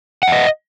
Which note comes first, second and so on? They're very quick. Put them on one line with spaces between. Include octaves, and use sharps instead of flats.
F#5 E5 D#5